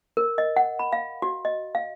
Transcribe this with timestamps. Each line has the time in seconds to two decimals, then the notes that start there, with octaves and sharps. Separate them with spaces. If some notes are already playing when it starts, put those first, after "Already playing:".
0.17 A#4
0.38 D#5
0.56 F#5
0.79 B5
0.93 F5
1.22 F#4
1.45 D#5
1.75 F5